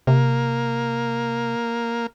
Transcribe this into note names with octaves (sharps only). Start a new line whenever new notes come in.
C3 A#3